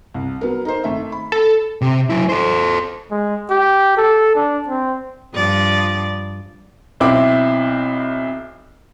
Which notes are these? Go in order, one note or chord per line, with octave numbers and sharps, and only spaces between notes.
C2
F#3 B3 A#4
D#4 A#4 C5
G#1 A3 E5
B5
A4
C3
F#3 E4
A4 C5
G#3
G4
A4
D4
C4
G2 F3 D5
B1 C4 E4 D6